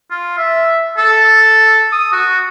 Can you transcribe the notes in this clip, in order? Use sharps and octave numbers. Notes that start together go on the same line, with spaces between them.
F4
E5
A4
D#6
F#4